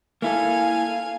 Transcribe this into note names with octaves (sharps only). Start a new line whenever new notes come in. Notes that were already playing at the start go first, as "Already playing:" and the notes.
A#3 E4 A4 F5 G#5